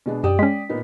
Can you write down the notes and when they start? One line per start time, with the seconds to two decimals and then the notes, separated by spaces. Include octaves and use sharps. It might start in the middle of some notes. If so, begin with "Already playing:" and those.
0.06 B2 G#3 D4
0.24 F#2 G4 D5 G5 D#6
0.39 G#3 C#4 B6
0.69 A#2 B3 D#4